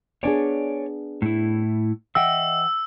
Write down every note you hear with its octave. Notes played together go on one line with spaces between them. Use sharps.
B3 D4 G#4 C#5 D5 G#5
A2 E4
E3 D#5 E5 F#5 G5 E6